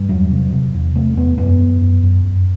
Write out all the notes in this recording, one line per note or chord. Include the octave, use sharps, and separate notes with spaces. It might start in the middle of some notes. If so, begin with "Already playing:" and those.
Already playing: G2
E2 F#3
C3
C3
E2
C3 A3
E2 B3
F#2 B3
F#2
F#2
F#2
F#2